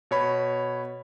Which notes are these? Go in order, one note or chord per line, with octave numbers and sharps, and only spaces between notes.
B2 C#5 B5